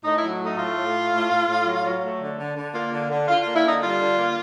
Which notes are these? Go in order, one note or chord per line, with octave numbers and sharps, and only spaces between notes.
A2 D#4
E4
F#3
A3 D#4
A2 F4
A2
A3
A2
A2
A2
F#3
F#3
A3
D3
D3
D3
A#3 F4
D3
D3
D3 F4
A#3 F4
E4
D3 D#4
G3 F4
D3
A#3